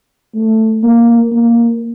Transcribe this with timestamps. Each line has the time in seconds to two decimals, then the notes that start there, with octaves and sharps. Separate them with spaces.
0.35 A3
0.83 A#3
1.32 A#3